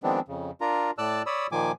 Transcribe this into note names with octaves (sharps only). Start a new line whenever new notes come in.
D#3 F3 G#3 B3 C4 D4
F2 C#3
D4 F4 A#4 A#5
A2 D5 A5 E6 F#6
C#5 D5 B5 D#6 E6
A#2 D#3 F3 A#3 G#5 D6